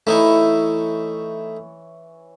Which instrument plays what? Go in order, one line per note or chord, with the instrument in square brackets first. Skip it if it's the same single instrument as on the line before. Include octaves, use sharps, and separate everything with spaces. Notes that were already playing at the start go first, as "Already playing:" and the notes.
[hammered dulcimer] E3 C#5 [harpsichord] A3 D#4 E4